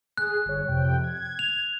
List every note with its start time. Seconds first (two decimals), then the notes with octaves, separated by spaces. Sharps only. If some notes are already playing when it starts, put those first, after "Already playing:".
0.18 G#4 F#6
0.46 G1 C#5
0.68 F2 C3 G5
1.03 G#6
1.39 F7